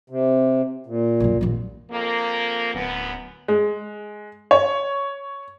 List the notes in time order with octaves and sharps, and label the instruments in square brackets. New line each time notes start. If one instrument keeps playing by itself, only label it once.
[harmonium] C3
A#2
[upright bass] B1 G2
A#1 D#2
[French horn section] F2 A#3
[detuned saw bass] D1 [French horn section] F#2 B3
[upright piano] G#3
C#5